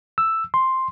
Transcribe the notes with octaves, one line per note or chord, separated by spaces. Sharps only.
E6
C6